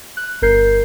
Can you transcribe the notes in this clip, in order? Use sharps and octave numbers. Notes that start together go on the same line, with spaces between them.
F#6
G1 A#4 G6 C7